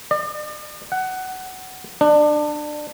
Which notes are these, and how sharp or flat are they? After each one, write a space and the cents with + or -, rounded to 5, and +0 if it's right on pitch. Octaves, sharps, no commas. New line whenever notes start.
D5 +45
F#5 +15
D4 +25